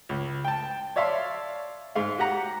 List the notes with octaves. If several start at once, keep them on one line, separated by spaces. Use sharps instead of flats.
C#2
G5 A5
C#5 D5 E5 F5 A5 C6
G#2 G#3 F5
F#4 G4 F#5 A#5